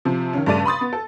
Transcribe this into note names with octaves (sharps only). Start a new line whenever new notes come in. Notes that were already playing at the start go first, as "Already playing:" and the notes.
C3 F3
D#3 C#4
G2 C#3 A3 D5 A5 D#7
B5 C6 D#6 A6
B3
A4